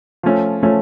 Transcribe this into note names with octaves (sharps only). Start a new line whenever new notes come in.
F3 A3 C#4
F3 A3 C#4